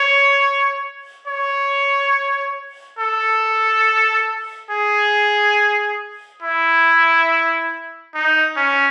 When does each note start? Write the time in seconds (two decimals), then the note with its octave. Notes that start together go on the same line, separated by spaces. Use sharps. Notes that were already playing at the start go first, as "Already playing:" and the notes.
Already playing: C#5
1.28 C#5
2.99 A4
4.70 G#4
6.42 E4
8.14 D#4
8.57 C#4